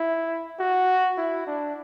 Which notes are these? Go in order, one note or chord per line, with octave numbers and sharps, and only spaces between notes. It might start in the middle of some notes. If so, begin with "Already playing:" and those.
Already playing: E4
F#4
E4
D4